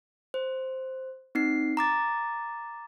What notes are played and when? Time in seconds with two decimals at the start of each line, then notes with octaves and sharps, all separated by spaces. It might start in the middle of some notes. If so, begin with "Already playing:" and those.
0.34 C5
1.35 C4 D#4 C7
1.77 A#5 D6 A6